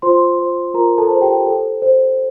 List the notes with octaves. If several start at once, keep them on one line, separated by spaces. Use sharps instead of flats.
F4 C5 C6
C5
F4 A#4 A#5
A4 A5
C5
G4 G5
A4
C5